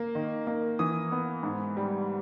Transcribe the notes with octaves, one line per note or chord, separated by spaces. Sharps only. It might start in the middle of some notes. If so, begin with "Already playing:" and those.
Already playing: A#3
D#3
A#3
E3 D#6
B3
G#2
G3